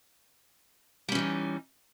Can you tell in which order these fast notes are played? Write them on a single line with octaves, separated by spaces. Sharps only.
G3 C#4 E3 D#4